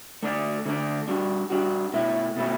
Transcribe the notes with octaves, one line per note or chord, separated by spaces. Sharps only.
D3 A3 D4 A4 D5
D3 A3 D4 A4 D5
G3 D4 F#4
G3 D4 F#4
B2 A3 E4
B2 A3 E4